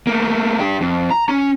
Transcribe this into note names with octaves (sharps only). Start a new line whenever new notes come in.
A3 A#3
D4 G4
F2
A#5
C#4